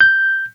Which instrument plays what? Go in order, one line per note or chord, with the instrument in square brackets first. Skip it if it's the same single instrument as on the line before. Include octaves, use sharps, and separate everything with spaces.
[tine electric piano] G6